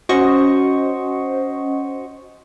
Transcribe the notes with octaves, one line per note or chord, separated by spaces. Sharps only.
C#4 F#4 C5 D#5 C#6